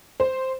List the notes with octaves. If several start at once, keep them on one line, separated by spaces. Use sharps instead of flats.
C5